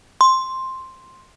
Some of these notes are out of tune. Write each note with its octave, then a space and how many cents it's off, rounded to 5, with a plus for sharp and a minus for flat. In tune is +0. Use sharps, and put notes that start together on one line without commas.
C6 +5